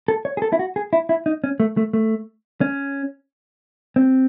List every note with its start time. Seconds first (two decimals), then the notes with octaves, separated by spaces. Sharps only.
0.08 A4
0.25 C#5
0.37 G#4
0.42 A4
0.52 E4
0.59 F#4
0.76 G#4
0.93 E4
1.09 E4
1.26 D#4
1.44 C#4
1.60 A3
1.77 A3
1.93 A3
2.61 C#4
3.96 C4